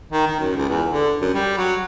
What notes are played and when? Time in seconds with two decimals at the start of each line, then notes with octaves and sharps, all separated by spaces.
0.12 D#3
0.27 D#3
0.39 F#2
0.56 C#2
0.70 E2
0.89 D3
1.21 F#2
1.34 G3
1.58 F#3